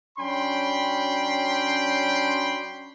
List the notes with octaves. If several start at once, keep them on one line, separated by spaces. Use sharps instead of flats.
F#3 C#4 D4 G5 B5 C6